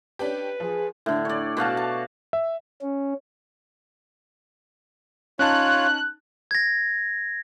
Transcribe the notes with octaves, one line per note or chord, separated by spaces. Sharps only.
C#4 D4 G4 B4
F3 G#4
A2 D3
C#5 D5
B2 F#4 F5 A5
A5
E5
C#4
C#4 D#4 F4 C#5 A5 F#6
G#6 A#6